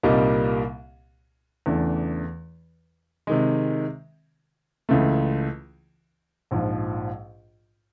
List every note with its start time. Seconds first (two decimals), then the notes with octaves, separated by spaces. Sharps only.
0.03 C2 A#2 G3 A#3 D#4
1.66 E2 C#3 E3 A3 D4
3.27 C3 D#3 G#3
4.89 C#2 C#3 E3 A3
6.51 A#1 G#2 F3